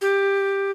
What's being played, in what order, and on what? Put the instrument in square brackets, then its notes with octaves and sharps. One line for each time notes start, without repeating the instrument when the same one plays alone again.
[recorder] G4